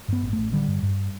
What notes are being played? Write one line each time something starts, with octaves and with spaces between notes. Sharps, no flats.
G2 B3
A1
A1 A3
D3 G3
G2
G2